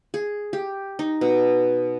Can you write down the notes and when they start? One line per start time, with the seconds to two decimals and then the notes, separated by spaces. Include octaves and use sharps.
0.14 G#4
0.53 G4
0.99 D#4
1.21 B2